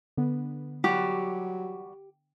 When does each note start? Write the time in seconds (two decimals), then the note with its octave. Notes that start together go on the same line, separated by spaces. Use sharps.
0.17 D3 B3
0.84 E2 F#3 G3 F#4 G4